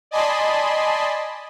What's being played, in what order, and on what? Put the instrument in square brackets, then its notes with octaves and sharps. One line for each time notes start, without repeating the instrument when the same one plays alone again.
[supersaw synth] D5 D#5 G#5 A5 B5 C6